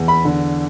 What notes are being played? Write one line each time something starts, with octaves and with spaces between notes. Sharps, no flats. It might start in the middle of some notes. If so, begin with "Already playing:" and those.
Already playing: E2
B5
D3